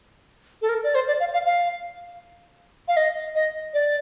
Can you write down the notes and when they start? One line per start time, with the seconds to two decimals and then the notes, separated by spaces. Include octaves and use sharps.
0.62 A4
0.69 A#4
0.84 D5
0.95 C5
1.08 D5
1.20 F5
1.33 F5
1.46 F5
2.88 F5
2.97 D#5
3.35 D#5
3.74 D5